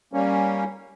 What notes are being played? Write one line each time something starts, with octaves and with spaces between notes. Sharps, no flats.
G3 A#3 C#4